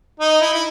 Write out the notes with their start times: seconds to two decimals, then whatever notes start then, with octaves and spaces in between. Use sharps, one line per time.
0.20 D#4
0.41 E4
0.54 E4